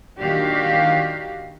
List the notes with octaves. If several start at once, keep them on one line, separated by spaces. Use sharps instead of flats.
A#2 D#3 D4 F#4 G4 F5